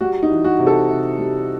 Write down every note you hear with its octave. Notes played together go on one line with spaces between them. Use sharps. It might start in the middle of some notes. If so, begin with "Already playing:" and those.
G3 F#4
D#4
E3
F#4
C3
A4
C3
G3